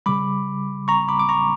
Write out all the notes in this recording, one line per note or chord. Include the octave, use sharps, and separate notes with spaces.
C#3 G3 B5 D6
A#5 C#6
B5 D6
D6
A#5 C#6